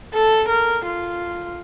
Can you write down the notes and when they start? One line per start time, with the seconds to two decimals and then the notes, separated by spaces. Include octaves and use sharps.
0.14 A4
0.49 A#4
0.86 F4